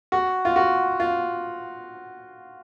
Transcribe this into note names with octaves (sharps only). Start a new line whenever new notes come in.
F#4
F4
F#4
F4